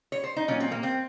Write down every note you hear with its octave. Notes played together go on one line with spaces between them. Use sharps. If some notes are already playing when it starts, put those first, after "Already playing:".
C#5
C5
D#4
A#2 F#3 C#4
C4
A#3
C4